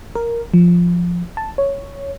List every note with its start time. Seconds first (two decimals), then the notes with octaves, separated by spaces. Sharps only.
0.16 A#4
0.54 F3
1.37 A5
1.58 C#5